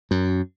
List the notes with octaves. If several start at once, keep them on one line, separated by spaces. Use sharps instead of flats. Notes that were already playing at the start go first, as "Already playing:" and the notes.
F#2